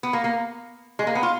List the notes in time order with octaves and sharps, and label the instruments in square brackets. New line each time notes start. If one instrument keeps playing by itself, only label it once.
[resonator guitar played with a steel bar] B3
A#3
A#3
G#3
A#3
B3
F4